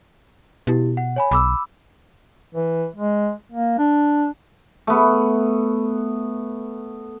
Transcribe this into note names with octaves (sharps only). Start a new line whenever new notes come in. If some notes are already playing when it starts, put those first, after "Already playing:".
B2 E4 G4
F#5
C#5 G#5 B5
B1 B5 D6 E6
E3
G#3
A#3
D4
A3 B3